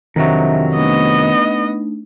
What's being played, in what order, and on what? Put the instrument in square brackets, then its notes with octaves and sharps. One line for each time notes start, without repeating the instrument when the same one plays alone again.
[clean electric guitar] F2 C3 F#3 [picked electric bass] D#3 [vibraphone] D4 D#5 E5
[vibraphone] A3 D4 D#4 [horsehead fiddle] B3 D#5